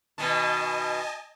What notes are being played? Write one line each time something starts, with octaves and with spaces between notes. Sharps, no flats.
B2 D#3 D#5 G#5 A5